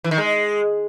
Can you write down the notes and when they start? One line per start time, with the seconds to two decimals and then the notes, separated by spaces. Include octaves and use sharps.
0.04 E3
0.11 D#3
0.18 G#3